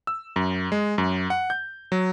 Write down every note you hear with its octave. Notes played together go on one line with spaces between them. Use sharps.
E6
F#2
G#3
F#2
F#5
G6
F#3